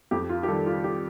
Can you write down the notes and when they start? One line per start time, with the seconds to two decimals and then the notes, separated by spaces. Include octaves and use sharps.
0.11 F2 G4
0.29 F4
0.43 G4
0.48 D#3 G3 A4
0.66 F4
0.84 G4